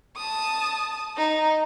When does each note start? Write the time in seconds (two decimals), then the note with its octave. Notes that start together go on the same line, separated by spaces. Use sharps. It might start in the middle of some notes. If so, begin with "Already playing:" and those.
0.17 A5 D#6
1.17 D#4